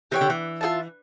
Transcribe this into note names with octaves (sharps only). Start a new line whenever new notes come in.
E3 G4 C#5 G5
D3
E3
F4 A4 E5 A5